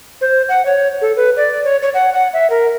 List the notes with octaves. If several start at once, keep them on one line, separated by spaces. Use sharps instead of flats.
C5
F#5
C#5
A4
B4
D5
C#5
C#5
F#5
F#5
E5
A#4